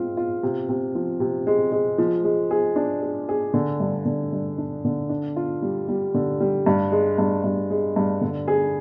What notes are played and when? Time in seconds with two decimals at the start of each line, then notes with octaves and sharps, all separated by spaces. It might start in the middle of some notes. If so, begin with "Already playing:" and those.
Already playing: G#2 C4 F4
0.17 F4
0.43 C3
0.69 C3
0.95 F3
1.20 C3
1.47 G#3
1.72 G#3
1.98 F3
2.24 G#3
2.51 G#4
2.76 D4
3.02 G#4
3.29 G#4
3.54 D3
3.80 G2
4.06 D3
4.32 G2
4.58 D4
4.85 D3
5.09 D4
5.36 F4
5.62 G3
5.89 G3
6.14 D3
6.40 G3
6.66 G2
6.92 G#3
7.18 G2
7.44 G2
7.70 G#3
7.96 G2
8.21 D3
8.48 G#4